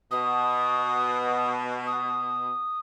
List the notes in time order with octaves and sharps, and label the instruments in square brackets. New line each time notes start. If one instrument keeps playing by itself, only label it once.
[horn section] B2 [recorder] D#6
[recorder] D#6